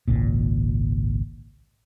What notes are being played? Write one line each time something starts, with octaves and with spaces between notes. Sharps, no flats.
G#1 C#2 A#2